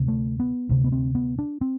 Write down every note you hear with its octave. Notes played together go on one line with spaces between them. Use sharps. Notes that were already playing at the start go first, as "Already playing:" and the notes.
Already playing: D2 C3
A3
B3
D2 C3
B3
C4
B3
D4
C4